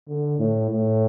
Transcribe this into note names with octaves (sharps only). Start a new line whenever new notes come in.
D3
A2
A2